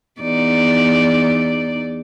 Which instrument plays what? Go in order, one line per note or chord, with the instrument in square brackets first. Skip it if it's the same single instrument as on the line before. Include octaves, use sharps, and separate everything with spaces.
[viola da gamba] E2 D#4 D5